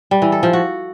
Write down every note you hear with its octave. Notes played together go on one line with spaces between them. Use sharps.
G3
E3
A4
F3
F#4